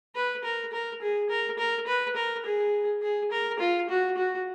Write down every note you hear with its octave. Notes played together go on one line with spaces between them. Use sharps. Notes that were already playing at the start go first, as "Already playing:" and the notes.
B4
A#4
A#4
G#4
A#4
A#4
B4
A#4
G#4
G#4
A#4
F4
F#4
F#4